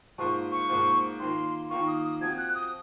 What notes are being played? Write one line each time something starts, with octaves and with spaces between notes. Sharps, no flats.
G#2 F3 A#3 F4 C5 C#6
C#6
G#2 F3 A#3 F4 C5
D#3 A#3 F4 A#4 C6
D#3 A#3 F4 A#4 C#6
D#6
D#6
F3 C4 F#4 G#6
F#6
D#6